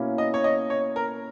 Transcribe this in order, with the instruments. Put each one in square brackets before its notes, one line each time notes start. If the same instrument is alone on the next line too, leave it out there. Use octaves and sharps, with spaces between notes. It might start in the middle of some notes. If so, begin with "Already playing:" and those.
Already playing: [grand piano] B2 A#3 C#4 E4
[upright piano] D#5
C#5
D#5
C#5
A#4